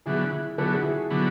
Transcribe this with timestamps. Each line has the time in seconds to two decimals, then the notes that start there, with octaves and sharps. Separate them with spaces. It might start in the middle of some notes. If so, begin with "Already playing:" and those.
0.06 D3 F#3 B3 E4 G#4
0.32 E4
0.58 D3 F#3 B3 A4
0.66 G#4
0.74 F#4
0.82 E4 G#4
1.10 D3 F#3 B3